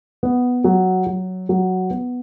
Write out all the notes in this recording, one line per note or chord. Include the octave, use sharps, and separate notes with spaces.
B3
F#3
F#3
F#3
B3